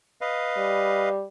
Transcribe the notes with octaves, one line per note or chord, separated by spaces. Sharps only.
B4 D#5 F5
G3